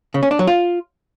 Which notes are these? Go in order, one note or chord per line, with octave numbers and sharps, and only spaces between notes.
C#3
C#4
D4
F#3
F4